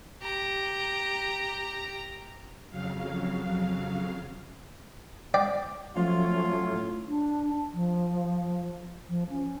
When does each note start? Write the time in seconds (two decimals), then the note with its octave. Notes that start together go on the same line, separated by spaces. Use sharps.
0.22 G4 A#5
2.70 F2 C#3 F#3 F5
5.34 D5 G5
5.96 F3 F#3 A3 C#4 F4
6.66 A2
7.07 D4
7.73 F3
9.09 F3
9.30 C#4